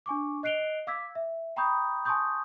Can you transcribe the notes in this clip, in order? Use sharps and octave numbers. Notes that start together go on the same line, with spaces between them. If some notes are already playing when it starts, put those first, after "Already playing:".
D4 G#5 C#6 D6
D#5 F#6 C7 D7 F7 G7
F5 D6 E6 G#6 B6
E5
G5 A#5 B5 C#6 D#6 G6
G#5 A5 C6 C#6 D#6 G6